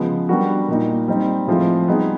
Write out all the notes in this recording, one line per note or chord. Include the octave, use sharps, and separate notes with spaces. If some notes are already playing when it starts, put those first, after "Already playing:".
Already playing: C#3 F3 G#3 B3
G3 B3 D4 F#4 A#4
A#2 G3 A#3 D#4
G3 C4 D#4
A2 F3 G#3 C4 F4
G3 B3 D#4 G#4